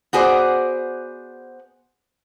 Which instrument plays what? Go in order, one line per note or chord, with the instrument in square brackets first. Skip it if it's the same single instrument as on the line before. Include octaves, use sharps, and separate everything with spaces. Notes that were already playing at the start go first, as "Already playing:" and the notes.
[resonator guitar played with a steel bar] B3 F#4 G#4 C5 D5